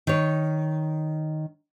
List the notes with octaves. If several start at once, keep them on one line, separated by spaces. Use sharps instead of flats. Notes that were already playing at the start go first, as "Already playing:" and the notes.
D#3 C#5